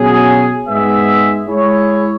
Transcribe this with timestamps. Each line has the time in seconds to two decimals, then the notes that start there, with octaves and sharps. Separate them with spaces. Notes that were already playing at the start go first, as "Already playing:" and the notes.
Already playing: B2 F#3 C#4 G#4
0.67 G#2 G#3 B3 G#4 E5
1.47 G#3 E4 G#4 C#5